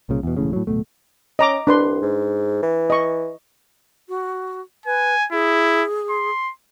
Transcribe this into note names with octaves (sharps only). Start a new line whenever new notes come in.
C2 A#2 C#3
E2 B2
E1 A1 A2 C#3
A2 F#3
D1 A#1 B2 A3
C#4 D#5 A#5 D6
C2 D4 B4 C6
G#2
E3
D#5 C#6
F#4
B4 G#5
E4 G#4
C6